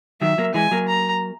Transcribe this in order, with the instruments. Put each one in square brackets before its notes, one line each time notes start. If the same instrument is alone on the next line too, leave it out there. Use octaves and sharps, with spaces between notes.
[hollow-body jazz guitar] D#3 F#3 [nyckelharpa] E5
[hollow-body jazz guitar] F#3 A#3
[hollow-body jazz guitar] E3 G#3 [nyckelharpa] G#5
[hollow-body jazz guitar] F#3 A#3
[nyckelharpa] A#5